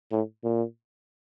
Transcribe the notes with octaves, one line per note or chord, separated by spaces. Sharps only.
A2
A#2